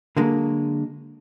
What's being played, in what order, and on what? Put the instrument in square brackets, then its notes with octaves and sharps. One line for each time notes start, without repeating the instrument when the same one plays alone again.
[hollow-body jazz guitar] D3 F#3 G#3 A#3